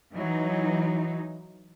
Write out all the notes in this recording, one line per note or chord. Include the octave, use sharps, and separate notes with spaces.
E3 F#3 D#4